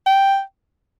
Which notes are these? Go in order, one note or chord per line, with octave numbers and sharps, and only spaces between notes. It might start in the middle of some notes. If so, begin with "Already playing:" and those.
G5